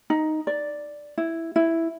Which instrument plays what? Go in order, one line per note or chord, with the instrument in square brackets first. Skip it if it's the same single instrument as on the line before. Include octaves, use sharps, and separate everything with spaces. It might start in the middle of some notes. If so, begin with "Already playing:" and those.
[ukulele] D#4
D5
E4
E4